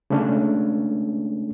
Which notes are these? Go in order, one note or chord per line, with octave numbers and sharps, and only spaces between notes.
C#3 G#3 A3 C#4 D4